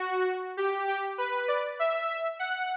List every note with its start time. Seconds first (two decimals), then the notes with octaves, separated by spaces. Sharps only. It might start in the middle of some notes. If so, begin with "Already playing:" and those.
Already playing: F#4
0.57 G4
0.88 G4
1.18 B4
1.48 D5
1.79 E5
2.09 E5
2.39 F#5